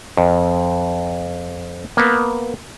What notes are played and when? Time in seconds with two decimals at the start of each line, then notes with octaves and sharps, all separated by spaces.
0.17 F2
1.97 A#3 B3